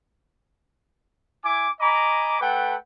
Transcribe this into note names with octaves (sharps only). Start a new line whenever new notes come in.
E4 G#5 D6
D#5 G#5 A#5 B5 D6
A3 A4 B4 F#5 G5